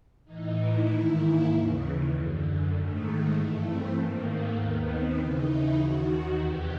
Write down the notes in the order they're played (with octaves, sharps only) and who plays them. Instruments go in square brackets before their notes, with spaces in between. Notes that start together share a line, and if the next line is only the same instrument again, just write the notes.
[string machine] A2 E3 D#4
E4
G#2 D#3
A#3
D#2 C#3 E3
F#2 D3
G#2 D#3 A3
G#3
G2 E3 A3
C4
G#2 D#3 A#3
A3
D#2 D#3 B3
C4
D#2 C#3 E3 D#4
E4
D#2 D#3 F#4
E2 C3 E3 G4